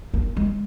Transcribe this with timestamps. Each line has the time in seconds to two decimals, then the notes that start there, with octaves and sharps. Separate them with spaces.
0.14 A#3
0.37 G#3